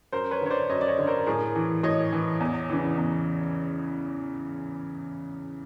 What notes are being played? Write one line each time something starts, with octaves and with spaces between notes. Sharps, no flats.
F#2 A#4 C5
B4 C#5
D3 C#5
C5 D5
F#2 C#5 D#5
D5
C#5 D#5
D3
A#4 C5
A2 G#4 A#4
E3
A2 C#5 D#5
E3
E2
C#3 E3
E2